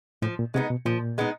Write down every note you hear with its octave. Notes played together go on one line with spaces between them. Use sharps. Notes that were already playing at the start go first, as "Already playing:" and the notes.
A2 F3
A#2
C3 G#3 B3 D#4
B2
A#2 F3
G#3 B3 D#4